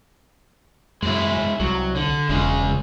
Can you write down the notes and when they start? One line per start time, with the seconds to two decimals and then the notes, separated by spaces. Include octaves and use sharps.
1.02 F#2 G#3 E4
1.60 C2 F#3
1.96 D3
2.29 E1 C#3 G#3